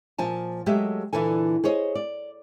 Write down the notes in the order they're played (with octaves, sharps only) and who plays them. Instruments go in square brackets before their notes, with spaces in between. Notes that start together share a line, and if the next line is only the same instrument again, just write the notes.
[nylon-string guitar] A#2 F3 G#5 A5
F#3 G#3 A3 G4 D#5 E5
A#2 D3 E3 E4 A4 G#5
G#4 C5 C#5 D#5
D5